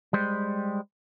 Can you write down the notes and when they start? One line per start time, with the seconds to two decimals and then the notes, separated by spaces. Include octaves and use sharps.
0.13 G3 G#3 C5